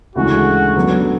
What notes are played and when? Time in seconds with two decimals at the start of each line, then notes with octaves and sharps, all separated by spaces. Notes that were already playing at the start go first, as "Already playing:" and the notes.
0.16 D2 C#3 E3 G#3 F#4
0.76 D3 F#3 B3